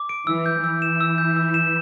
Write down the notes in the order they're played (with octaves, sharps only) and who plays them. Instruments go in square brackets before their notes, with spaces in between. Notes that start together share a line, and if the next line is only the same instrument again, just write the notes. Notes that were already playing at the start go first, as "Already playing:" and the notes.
Already playing: [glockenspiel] D6
D7
[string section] E3 [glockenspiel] E6
[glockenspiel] G6
[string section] E3 [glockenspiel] E6
[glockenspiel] E7
E6
G6
E6
E7